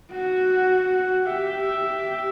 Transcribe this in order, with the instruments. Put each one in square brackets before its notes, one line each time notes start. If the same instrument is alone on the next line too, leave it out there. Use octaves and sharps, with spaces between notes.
[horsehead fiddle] F#4 [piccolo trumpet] F#5
[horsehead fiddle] G4 [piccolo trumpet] E5
[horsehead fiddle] G4